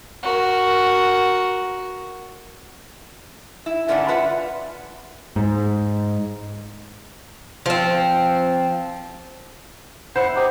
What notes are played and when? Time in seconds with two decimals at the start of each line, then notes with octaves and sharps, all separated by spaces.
0.23 F#4 A#4
3.66 E4
3.88 G#2 D3 C#4 D4 D5 F#5
4.08 F4 B4 E5 F#5
5.36 G#2
7.66 F3 C4
10.16 E4 C5 F#5
10.36 D#4 G4